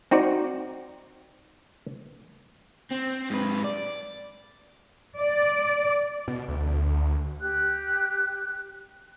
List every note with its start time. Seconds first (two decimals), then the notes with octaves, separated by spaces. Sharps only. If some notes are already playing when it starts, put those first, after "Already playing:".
0.11 C4 D#4 F#4 C5 D5
2.91 C4
3.30 G#2 B4
3.64 D5
5.17 D5
6.28 B2
6.48 D2
6.86 D2
7.40 G4 F#6